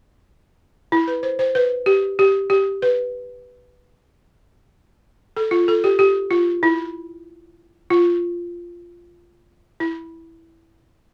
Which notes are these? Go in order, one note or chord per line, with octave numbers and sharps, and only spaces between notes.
E4
B4
C5
C5
B4
G4
G4
G4
B4
A4
F4
A4
G4
G4
F4
E4
F4
E4